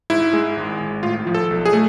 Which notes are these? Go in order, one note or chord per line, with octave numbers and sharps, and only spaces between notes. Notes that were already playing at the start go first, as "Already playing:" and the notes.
G#2 E4
G#3
G#1
G#1
A2 F4
F3
A4
B1
G#4
A3